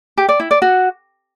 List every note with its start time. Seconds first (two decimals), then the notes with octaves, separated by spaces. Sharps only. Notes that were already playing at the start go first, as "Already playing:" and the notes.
0.17 G4
0.29 D5
0.40 E4
0.51 D5
0.62 F#4